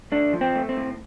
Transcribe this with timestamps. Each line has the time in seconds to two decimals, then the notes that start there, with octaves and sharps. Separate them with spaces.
0.12 A3 D4
0.33 F3
0.41 C4
0.56 A3
0.69 C4
0.77 A2